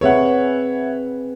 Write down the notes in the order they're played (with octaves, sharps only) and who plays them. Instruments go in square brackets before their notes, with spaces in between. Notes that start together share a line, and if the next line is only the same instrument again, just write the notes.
[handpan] C4 G#4 B4 [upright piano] C#5 E5 F#5